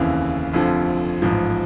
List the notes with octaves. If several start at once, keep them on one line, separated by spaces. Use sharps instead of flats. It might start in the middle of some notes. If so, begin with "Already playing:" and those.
Already playing: F1 D#2 C#3 E3
F1 F2 D3 F3
A1 G#2 F3